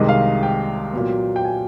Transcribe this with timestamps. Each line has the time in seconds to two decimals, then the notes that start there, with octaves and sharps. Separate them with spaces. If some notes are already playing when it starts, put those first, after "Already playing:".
Already playing: C2 C3 D#3 G#3 D#5
0.09 F5
0.43 G5
0.93 A#2 F#3 B3
1.36 G5
1.45 G#5